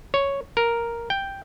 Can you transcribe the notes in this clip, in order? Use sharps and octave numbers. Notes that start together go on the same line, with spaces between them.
C#5
A#4
G5